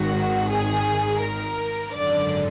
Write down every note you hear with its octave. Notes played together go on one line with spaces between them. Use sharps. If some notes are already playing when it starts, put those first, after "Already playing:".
Already playing: G#1 G#2 D#3 F#4
G#4
A#4
G#1 F#2 D3 D5